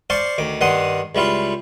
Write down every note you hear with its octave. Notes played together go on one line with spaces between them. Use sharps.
C5 D5 F5 A5 C6 C#6
D2 D#3 D6
G2 D#3 D4 F#5 C6 D#6
C#2 G3 E4 F4 F5